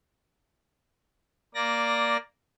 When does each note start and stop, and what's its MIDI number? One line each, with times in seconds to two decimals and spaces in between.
1.55 2.17 58
1.55 2.17 74
1.55 2.17 94